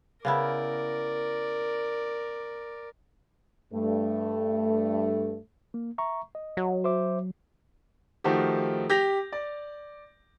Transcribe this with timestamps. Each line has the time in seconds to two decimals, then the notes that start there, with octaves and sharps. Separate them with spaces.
0.25 C#3 B3 E4 A#4 D5
3.73 G2 A3
5.74 A#3
5.98 E5 A#5 C#6
6.35 D#5
6.57 F#3
6.84 C5 E5 D6
8.24 D#3 F3 A3 D#4 F#4 G4
8.90 G4 G6 A#6 F7
9.32 D5